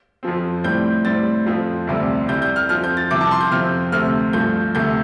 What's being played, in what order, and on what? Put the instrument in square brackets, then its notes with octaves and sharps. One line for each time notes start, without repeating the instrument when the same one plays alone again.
[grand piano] F2 F3 C4
A2 G3 C4 G6
A2 G3 C4 A6
F2 F3 C4
D2 C3 G3 C4
C2 C3 G3 G6
G6
F6
F2 F3 C4 F6
G6
A6
C2 C3 F3 D6
A5
C6
G6
F2 C3 F3 C4 F6
D2 C3 A3 C4 F6
G2 F3 A3 G6
D2 C3 A3 G6